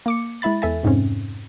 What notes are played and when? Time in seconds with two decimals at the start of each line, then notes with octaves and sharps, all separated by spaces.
0.06 A#3 D6 C#7
0.42 G#3 E4 E5 B5 A6
0.62 E2 A4 E5 G#5 A6
0.83 F2 G#2 C3 C4 C#4